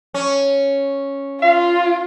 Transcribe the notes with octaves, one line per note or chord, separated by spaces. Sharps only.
C#4
F4 F5